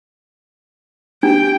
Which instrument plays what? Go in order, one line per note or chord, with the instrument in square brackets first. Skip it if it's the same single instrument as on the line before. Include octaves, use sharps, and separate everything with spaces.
[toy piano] D4 [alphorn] G4 [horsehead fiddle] G5